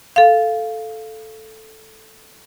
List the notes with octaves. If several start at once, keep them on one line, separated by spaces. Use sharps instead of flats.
A4 F5